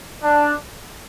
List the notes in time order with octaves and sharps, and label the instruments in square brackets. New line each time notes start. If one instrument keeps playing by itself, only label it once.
[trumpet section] D4